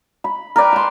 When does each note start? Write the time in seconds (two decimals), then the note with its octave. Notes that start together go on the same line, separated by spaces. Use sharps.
0.24 B5
0.56 A#4 B4 D5 G5
0.73 A5 C6